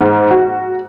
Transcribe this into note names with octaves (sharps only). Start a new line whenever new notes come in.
G#2
F#4